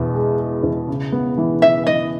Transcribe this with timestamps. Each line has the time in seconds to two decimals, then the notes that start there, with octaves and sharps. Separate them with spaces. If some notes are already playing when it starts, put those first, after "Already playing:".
Already playing: E2 B2
0.14 G#3
0.39 G#3
0.63 E2
0.88 C#3
1.12 B3
1.38 E3
1.62 E3 E5
1.87 E3 D#5